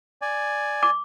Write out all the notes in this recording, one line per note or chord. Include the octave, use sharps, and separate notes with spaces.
D5 G#5
D6